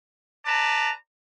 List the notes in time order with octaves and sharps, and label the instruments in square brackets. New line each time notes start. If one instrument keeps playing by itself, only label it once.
[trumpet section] B4 D5 A5 A#5